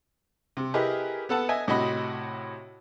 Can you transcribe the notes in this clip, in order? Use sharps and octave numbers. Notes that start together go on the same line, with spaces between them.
C3
E4 G4 G#4 A#4 B4 D#5
B3 A4 F#5 A5
D#5 E5 G#5
A2 C3 F#4 D#5 B5